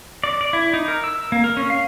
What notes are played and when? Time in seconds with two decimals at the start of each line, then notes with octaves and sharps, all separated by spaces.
0.24 D5
0.41 D5
0.53 E4
0.74 D#4
0.88 A#4
1.04 E6
1.32 A#3
1.44 A#4
1.57 C#4
1.70 F5